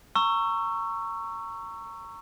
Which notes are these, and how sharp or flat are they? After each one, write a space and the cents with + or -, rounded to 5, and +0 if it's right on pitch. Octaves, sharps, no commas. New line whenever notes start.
A#5 -20 C#6 +0 E6 +25